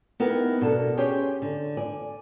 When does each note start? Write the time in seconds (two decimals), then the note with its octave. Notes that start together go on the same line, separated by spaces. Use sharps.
0.20 B3 D#4 E4 G4 A#4
0.61 B2 D4 A4 A#4
0.97 C#4 G4 G#4 C5 C#5
1.42 D3
1.77 D5 G#5